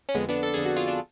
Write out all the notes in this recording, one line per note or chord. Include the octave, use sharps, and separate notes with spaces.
C#4
F2 D3 G#3 B3
B3 D4
A4
F2 D3 G#4
F#4
F4 G#4
D4